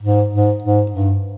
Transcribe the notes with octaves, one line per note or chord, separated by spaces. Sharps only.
G#2
G#2
G#2
G2